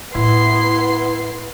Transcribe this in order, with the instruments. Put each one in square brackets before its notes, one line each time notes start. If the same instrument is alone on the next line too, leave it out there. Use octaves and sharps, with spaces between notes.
[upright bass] A2 [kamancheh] B3 C6 [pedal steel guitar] E4